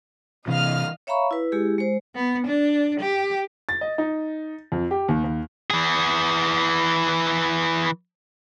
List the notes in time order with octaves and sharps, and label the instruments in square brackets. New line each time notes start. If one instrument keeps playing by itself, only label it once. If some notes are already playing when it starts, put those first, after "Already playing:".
[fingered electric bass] C3 E3 [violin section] D#5 F5 F6
[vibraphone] C#5 E5 F5 A#5 B5 C#6
E4 B4
G#3 E4 G4 G#4
G#3 C5
[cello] B3
D4
G4
[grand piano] A6
D#5
D#4
F2
G4
D#2
D#2
[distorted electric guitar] E3 G#4